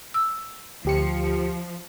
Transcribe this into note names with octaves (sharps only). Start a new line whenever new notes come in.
E6
D2 F3 G4 C#7